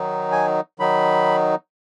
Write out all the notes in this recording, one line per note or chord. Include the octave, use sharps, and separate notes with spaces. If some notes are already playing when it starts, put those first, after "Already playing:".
Already playing: D#3 F#3 D#4
G#5
D#3 F#3 D#4 B5